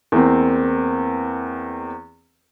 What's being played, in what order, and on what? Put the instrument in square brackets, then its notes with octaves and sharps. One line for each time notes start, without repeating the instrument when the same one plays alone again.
[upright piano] E2 A#3 C4